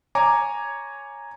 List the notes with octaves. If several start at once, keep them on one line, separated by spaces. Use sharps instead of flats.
C#5 G#5 A#5 D6